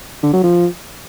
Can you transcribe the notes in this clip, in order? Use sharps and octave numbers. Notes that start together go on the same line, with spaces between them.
D3
F#3
F3